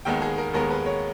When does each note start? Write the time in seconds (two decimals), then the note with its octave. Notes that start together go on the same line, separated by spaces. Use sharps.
0.05 D#2 D#3 G#3 B3 G5
0.22 G#4
0.38 A#4
0.54 D#2 D#3 G#3 B3 A#4
0.71 B4
0.86 C#5